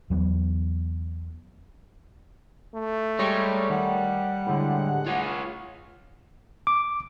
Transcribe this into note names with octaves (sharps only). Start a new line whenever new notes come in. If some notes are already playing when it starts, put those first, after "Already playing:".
E2 F#3 G3 B3
A3
G3 G#3 C#5 A#5
D#3 F#5
A2 D3 G#3
F4 G#4 C#5
D6